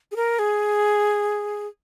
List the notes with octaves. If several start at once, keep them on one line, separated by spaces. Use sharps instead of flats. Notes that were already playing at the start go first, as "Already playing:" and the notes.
G#4
A#4
G#4